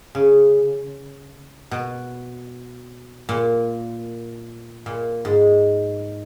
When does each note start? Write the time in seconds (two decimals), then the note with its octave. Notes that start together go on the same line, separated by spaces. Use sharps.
0.15 C#3
1.71 B2
3.29 A#2
4.86 A#2
5.25 G#2